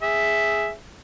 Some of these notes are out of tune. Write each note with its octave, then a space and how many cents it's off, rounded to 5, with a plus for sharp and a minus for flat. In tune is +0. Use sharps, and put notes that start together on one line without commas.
G#4 +0 E5 +0